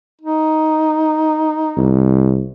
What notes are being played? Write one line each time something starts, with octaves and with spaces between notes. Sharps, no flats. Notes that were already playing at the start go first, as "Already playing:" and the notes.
D#4
C2